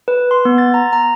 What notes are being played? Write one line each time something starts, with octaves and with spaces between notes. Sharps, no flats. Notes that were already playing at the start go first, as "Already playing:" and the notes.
B4
C6
B3
A6
A#5
A#5